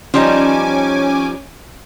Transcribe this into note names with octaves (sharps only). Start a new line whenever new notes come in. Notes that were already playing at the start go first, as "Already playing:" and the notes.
F3 G3 C#4 D#4 G#5 D6